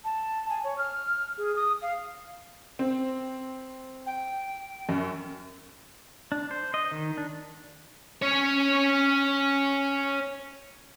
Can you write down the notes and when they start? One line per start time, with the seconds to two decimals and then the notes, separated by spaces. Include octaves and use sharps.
0.05 A5
0.50 G#5
0.64 C#5
0.78 F6
1.38 G#4
1.56 D#6
1.82 F5
2.79 C4
4.06 G5
4.89 F#2
6.32 D4
6.51 C5
6.74 D#5
6.92 D#3
7.17 D4
8.22 C#4 C#5